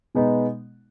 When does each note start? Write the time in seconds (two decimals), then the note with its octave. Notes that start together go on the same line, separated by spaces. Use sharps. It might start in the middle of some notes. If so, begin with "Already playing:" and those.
0.14 B2 G#3 B3 D#4